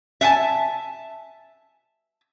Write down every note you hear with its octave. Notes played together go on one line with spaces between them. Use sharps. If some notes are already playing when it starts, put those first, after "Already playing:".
E5 F#5 G#5 A5